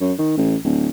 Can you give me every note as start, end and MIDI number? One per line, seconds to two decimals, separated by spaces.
0.01 0.13 42
0.19 0.37 51
0.37 0.56 33
0.64 0.89 26